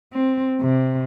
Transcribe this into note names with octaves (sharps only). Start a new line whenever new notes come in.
C4
C3